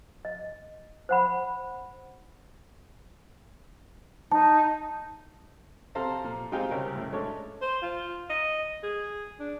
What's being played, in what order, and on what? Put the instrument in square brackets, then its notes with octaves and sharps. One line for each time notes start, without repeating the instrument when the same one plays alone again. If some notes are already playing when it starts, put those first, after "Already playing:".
[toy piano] D#5
C5 F#5 B5
[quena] D#4 [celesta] A5
[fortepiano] C3 C4 A4 C5 F5 A#5
A#2
G#3 C4 D#4 F4 G4 G#4
C2 C#3 A#4
A2
G#3 A3 C#4 D4 A4 C#5
[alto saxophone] C5
F4
D#5
G#4
D4